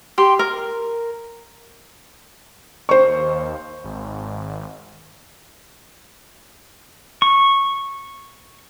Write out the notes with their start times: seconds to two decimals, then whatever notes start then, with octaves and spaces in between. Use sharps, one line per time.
0.18 G4 C6
0.39 A#4
2.89 D#2 C5 C#6
3.84 G#1
7.22 C#6